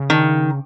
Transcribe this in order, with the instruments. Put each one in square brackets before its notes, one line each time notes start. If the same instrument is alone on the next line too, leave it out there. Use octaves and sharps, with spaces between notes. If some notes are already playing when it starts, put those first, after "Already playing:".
Already playing: [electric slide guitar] C#3
[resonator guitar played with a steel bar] D#3